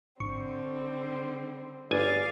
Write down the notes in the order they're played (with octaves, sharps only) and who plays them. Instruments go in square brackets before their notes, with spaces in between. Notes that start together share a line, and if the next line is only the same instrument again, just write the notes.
[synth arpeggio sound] G#1 C#6 [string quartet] D3 G3 C4
[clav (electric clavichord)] G1 G#5 [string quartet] G#4 F5 [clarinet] D5